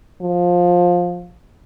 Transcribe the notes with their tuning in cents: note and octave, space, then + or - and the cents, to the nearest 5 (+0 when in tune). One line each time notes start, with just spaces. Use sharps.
F3 +15